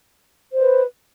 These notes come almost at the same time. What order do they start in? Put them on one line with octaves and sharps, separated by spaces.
C5 D5 B4